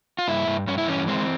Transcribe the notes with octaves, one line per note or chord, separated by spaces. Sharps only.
F4
G2 E4
G2
G2 C#4
E4
E3 C#4
G#3 C4